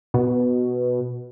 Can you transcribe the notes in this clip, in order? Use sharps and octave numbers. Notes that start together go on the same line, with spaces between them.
B2